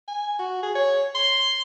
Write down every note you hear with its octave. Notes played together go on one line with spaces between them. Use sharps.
G#5
F#4
G#4
C#5
C6